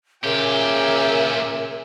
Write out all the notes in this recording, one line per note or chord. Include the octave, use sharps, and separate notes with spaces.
A#2 C#3 G4 A#4 E5 G#5